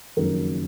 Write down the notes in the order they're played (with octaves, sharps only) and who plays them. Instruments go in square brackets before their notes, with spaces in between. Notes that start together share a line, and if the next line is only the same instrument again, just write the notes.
[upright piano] F#1 F2 D#3 F#3 A#4